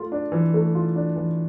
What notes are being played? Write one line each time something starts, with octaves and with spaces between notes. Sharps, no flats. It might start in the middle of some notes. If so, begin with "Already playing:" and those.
Already playing: A3 F4
D4
E3
A3
F4
D4
E3